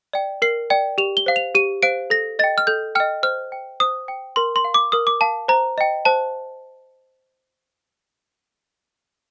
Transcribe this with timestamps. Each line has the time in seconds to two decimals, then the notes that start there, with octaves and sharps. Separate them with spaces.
0.13 D5 G5
0.42 A#4 C7
0.70 D5 G5
0.98 G4 F7
1.17 G7
1.26 C5 F5
1.36 F7
1.55 G4 D#7
1.83 C5 F5 D7
2.10 A4 A#6
2.39 D#5 G5 A6
2.58 F6
2.67 A4 G6
2.95 D#5 G5 F6
3.23 C5 F6
3.52 G5
3.80 C5 D#6
4.08 G5
4.36 A#4 C6
4.56 C6
4.65 F5
4.74 D6
4.92 A#4 D#6
5.07 D6
5.21 F5 A5
5.48 C5 A#5
5.78 D#5 G5
6.05 C5 A5